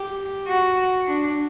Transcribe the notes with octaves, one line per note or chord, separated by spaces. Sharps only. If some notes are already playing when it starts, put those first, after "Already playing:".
Already playing: G4
F#4
D4